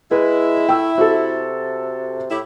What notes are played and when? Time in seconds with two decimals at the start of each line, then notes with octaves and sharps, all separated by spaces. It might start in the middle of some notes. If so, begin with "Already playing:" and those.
0.11 G#3 E4 B4
0.69 A3 G5 E6
0.98 C3 F#4 A4
2.31 A2 E4 G4